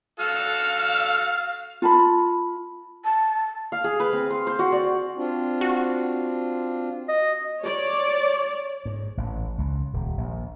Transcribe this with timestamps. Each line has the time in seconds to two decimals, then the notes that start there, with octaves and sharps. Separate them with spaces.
0.20 F#4 A4 F5 E6
1.82 F4 A5 B5
3.04 A5
3.72 F5
3.84 G#4
4.00 B4
4.13 C4
4.30 C6
4.47 C5
4.59 F#4
4.72 D5
5.17 C4 D4 F4
5.61 F#4
7.08 D#5
7.63 C#5 D5
8.85 G#2
9.17 A1
9.58 C#2
9.93 D#1
10.18 A#1